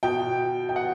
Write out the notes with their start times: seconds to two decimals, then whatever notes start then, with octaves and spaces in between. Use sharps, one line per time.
0.03 B2 G5
0.69 G5
0.76 F#5